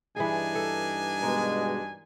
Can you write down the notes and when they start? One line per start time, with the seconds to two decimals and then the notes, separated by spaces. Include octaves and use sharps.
0.16 G2 E3 D4 D#4 G#4 G#5
0.55 A4
1.23 B2 G#3 A#4